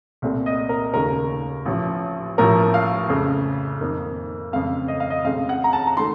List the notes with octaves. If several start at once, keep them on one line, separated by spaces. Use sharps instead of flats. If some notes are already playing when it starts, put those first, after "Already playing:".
C2 A#2 A3 C4
D#5
A#4
D#2 C#3 A3 A#4
A1 A2 F3
A1 A2 F3 A#3 A#4
F5
F2 C#3 A3
F2 D#3 A#3
F2 C#3 A3 C4 F5
D#5
F5
D#5
C#2 C#3 A3 C4 F5
F#5
A#5
A5
A#5
D#3 A3 C6